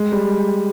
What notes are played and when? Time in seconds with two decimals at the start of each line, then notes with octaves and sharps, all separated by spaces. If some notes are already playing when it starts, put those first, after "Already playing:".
Already playing: G#3
0.12 G3